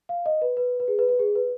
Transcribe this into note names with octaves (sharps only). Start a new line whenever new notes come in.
F5
D#5
B4
B4
B4
G#4
B4
B4
G#4
B4